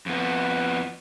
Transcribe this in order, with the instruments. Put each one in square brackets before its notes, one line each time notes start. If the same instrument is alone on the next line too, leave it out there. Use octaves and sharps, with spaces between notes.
[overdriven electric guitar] F2 B3